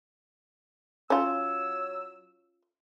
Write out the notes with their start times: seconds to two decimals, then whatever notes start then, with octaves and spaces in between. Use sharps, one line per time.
1.10 F#3 C#4 F4 C#5 E6